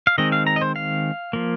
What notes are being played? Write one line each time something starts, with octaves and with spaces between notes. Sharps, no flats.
F5
D#3 G#3 C4 D#5
F5
A#5
D#5
C5
F5
F3 A#3